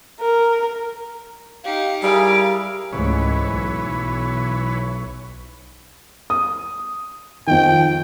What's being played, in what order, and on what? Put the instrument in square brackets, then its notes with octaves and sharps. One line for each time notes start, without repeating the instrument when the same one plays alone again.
[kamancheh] A#4
[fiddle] D#4 G4 [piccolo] F5
[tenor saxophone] G3 [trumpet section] E4 G#4 A#4 [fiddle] F5 [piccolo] D7
[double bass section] C#2 G#2 A3 [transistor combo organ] E3 B4 C#5
[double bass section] B1
[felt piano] D#6
[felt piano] F2 D#3 [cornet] G5